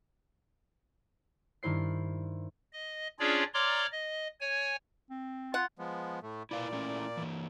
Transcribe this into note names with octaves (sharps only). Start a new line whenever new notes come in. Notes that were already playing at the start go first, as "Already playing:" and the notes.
G2 D#3 E4 C5 C7
D#5
C#4 D4 F4 G#4 C#5 D5
C#5 D5 A#5 C6 D6 F6
D#5
C#5 G#5
C4
F4 F#5
F3 G#3 B3
A2 A3
A#2 E4 B4 D5 F5
A3 C#4 E4
E3 A#3